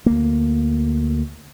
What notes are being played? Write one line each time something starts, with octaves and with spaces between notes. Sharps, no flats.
D2 A#3